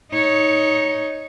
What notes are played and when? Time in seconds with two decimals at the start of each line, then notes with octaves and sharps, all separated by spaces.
0.12 D#4 C#5